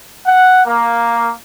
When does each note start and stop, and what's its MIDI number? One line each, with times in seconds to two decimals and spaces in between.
0.24 0.60 78
0.64 1.30 58